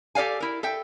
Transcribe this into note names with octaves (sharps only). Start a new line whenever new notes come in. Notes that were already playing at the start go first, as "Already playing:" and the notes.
G4 A4 D5 F5 G#5
E4 A#4
A4 E5 G5